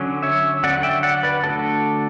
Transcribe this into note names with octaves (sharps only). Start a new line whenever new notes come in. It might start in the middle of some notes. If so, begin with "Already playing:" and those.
Already playing: D3 F#3 C#4
C#5 E5
D3 F#3 C#4 D5 F#5
E5 G5
D5 F#5
B4 D5
D3 A3 D4 F#4 A4